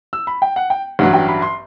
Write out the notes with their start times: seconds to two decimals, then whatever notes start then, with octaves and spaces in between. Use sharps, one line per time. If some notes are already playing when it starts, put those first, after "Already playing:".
0.13 E6
0.27 B5
0.42 G5
0.56 F#5
0.70 G5
0.99 A1 G2 F#3 F#5
1.14 G5
1.28 B5
1.42 C6